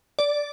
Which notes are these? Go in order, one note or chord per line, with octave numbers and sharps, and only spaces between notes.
D5